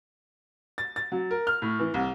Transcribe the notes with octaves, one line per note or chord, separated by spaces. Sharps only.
A6
A6
F#3
A#4
F6
A2
E3
C2